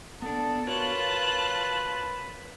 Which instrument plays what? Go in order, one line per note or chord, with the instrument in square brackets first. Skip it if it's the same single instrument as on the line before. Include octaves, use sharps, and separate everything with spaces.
[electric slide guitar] B3 D4 [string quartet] A4 [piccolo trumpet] A5
[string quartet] F4 A5 F#6 [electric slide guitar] F#4 A#4 C#5 [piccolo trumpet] B4